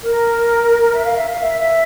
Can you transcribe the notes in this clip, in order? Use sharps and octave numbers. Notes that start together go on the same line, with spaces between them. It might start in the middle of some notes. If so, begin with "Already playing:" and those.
A#4
E5
F5
E5
F5
E5